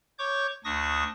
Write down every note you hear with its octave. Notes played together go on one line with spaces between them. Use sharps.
C#5 C#6 D6 G6
D2 D4 C#6 D#6 A#6